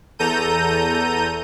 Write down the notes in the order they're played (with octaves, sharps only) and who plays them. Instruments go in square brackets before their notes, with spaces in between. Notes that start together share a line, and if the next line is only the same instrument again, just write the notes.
[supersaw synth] E2 A4 A#5 G6 D#7